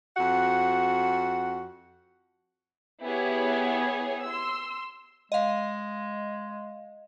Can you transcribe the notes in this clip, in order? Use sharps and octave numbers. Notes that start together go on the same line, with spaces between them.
F2 F#4 F#5
B3 E4 G4 G#4 C#5
C6 E6
G#3 D#5 F5